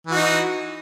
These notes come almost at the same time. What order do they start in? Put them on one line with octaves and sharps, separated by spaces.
E3 F#4 D#4